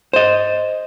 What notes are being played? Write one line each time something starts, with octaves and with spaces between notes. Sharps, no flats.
C5 D#5